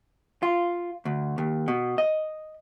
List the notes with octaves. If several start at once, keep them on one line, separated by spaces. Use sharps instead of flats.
F4
D2
D#2
B2
D#5